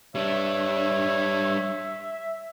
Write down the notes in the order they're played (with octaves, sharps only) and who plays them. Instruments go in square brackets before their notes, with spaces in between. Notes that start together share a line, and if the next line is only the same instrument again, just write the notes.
[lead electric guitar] G3 D4 [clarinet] C#5 [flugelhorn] E5